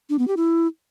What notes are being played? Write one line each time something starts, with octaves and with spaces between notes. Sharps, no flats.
D4
B3
G4
E4